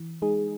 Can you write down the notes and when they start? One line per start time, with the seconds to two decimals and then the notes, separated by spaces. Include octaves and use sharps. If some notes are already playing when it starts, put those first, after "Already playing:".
Already playing: E3
0.22 G#3 D#4 G#4